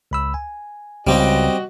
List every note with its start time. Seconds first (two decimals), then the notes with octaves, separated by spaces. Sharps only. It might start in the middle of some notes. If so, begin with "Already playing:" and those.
0.11 C#2 B5 E6
0.34 G#5
1.07 C#2 G3 C4 F#4 G4 D#5